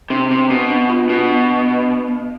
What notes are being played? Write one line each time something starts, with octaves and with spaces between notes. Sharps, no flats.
C3 D4
C3 D4
B2 B3
D4
F4
B2 B3
D4
B3
B3
B3
B3